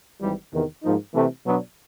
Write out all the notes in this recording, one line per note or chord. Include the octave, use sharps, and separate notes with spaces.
G#1 G#2 E3 G3
E2 C3 D#3
G#2 F3 A#3 D#4
C3 E3 A3
B2 F#3 B3 D4